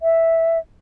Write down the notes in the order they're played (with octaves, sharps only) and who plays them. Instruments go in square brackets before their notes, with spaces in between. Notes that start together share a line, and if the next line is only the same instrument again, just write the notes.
[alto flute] E5